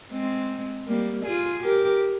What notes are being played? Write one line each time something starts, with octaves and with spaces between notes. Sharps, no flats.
G#3 C4
G3 A#3
F4 G#4
G4 A#4